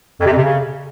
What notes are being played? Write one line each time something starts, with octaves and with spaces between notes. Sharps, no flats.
F2
C3
F2
C3
C#3